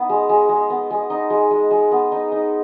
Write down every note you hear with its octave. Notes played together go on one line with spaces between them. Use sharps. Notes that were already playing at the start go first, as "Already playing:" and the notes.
Already playing: B3 D#4
G#3
G#3
G#3
B3
G#3
D#4
G#3
G#3
G#3
B3
D#4
D#4